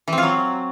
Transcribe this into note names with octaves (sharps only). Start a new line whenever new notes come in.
E3
C4
F4
F#3